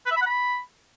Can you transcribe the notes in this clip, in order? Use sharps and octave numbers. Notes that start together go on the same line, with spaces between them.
B4
E5
B5
F#5
B5